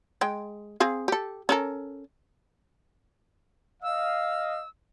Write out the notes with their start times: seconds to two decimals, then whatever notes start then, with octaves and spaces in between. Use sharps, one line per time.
0.21 G#3 G5
0.80 C4 G#4 F5
1.08 G4 A4
1.49 C#4 A4 A#4
3.83 D#5 F5 E6